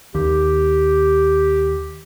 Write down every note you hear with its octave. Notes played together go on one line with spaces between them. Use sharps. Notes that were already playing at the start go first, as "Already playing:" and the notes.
D#2 G4